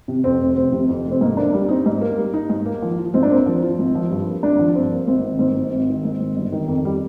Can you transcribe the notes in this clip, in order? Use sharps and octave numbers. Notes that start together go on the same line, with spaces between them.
C3
F2 C4
F1
F1 C4
C3
F2
F1
C4
G#2 A#3
A#3 D4
G3 D4
C4 D#4
G#2
A#3
G3
D#4
G#2
A#3
F3
F4
G#2 C4
D4
A#3 C4
F3
F4
G#1
F3
G2
A#3
G#1 D4
F3
G2 C4
A#3
G#1 C4
D#3
G#2 C4
G#1
G#1
D#3
G#2
G#1
G1
D#3
F2
G3